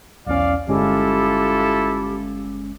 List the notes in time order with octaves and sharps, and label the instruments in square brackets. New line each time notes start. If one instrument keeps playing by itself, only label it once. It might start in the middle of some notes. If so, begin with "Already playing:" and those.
[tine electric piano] B1 E2 C#4 [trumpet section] D5 F5
[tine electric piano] G1 G#3 C#4 [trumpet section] E4 F4 A4 [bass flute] G4